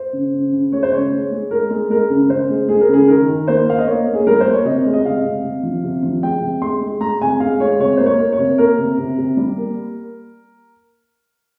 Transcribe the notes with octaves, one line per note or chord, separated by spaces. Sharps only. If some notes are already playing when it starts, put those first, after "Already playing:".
Already playing: C5
C#3
C#3
C#3
G#3 C#5
C5
C#3 C#5
G#3
G#3
G#3 A#4
G#3
G#3 A#4
C#3
C#3 C5
G#3
G#3 G#4
A#4
C#3 G#4
D#3 A#4
D#3
A#3 C5
A#3 F5
D#5
A#3 C#5
A#3
G#4
G3 A#4
C5
A#3
C#5
C3 D#5
G#3
D#5
C3 F5
C3
C3
F3
C3
F3
G#3 G5
C3
G#3 C6
G#3
G#3 A#5
C3 G#5
G#3 F5
G#3 C#5
C3 C#5
A#3 C5
C#5
A#3
C#5
C3
A#3 A#4
C3
C3
C3
G3
A#3